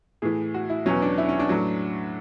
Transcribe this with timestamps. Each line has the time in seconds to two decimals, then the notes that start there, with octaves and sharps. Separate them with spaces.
0.22 A2 E3 G#4
0.54 F#4
0.70 E4
0.86 E2 B2 F#3 C#4
1.02 D4
1.18 E4
1.29 C#4
1.39 D4
1.49 A2 F#3